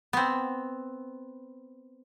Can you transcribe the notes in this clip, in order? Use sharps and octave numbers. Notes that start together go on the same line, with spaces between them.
B3 C4